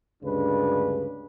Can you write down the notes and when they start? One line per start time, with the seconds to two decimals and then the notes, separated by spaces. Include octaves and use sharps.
0.23 D2 G2 C#3 G#3 D4 B4